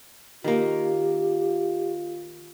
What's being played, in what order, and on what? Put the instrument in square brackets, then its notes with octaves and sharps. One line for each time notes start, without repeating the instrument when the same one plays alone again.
[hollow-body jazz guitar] D#3 A#3 [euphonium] F4 [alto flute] G4